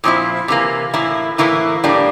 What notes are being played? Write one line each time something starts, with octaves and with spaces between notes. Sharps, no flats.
A#2 F3 C4 E4
C3 E3 A#3
A2 E3 A#3 E4
A2 E3 A#3 E4
A2 G3 A#3 D4